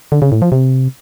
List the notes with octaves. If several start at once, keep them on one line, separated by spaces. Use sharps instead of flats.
D3
C#3
A2
F3
C3